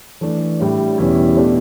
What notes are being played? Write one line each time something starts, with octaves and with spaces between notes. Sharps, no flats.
E3 A3 D4
A2 G3 D4
E2 B2 G3 C#4 E4
B2 A3 D4 G4